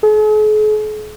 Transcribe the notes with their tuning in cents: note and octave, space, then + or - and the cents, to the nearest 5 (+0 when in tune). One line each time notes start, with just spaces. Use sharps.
G#4 +45